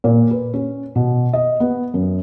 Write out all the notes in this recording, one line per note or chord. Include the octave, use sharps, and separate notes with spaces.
A#2
B4
C#4
B2
D#5
B3
F#2